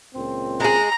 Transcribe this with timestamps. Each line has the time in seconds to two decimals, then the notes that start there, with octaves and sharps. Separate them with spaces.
0.15 C#2 A#2 C4
0.60 G#3 G#4 A#5